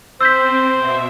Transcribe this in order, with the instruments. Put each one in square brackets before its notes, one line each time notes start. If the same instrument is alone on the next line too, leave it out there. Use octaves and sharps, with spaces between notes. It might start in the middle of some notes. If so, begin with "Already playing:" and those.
[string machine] C4 [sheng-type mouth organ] C5 [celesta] E6 G6 B6
[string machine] B2 E5